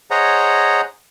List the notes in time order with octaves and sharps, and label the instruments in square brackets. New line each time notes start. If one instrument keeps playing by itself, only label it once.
[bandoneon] G#4 C5 C#5 D#5 F#5 A#5